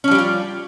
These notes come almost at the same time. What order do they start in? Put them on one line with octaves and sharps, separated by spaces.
C#4 F3 G3 G4 F4